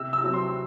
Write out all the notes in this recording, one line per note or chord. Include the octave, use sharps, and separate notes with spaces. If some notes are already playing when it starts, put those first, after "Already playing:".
Already playing: C3 E6
E6
F#3 C4
C6